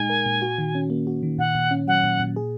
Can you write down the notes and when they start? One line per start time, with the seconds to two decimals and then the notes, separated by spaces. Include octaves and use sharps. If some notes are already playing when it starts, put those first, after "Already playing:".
Already playing: A#2 G#3 D#4 G#5
0.10 A#4
0.26 A#2
0.42 F#4
0.58 D#3
0.75 C#4
0.90 A#3
1.07 F#4
1.23 D#3
1.38 A#2 F#5
1.55 A#2
1.71 C#4
1.87 F#3 F#5
2.04 A#2
2.20 A#2
2.36 G#4